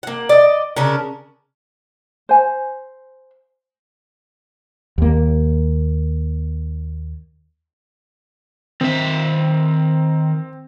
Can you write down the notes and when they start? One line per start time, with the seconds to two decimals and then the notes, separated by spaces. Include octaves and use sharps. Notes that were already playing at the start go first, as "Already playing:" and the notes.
0.03 A#3 F#5
0.29 D5 D#5
0.76 C#3 C#4 D4 A#4
2.29 C5 G#5
4.98 D#2 A#3
8.81 D#3 C4 E5